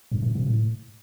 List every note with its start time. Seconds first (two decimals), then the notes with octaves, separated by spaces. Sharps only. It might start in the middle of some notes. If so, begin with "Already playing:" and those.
0.12 G2
0.22 A2
0.35 B2
0.46 A2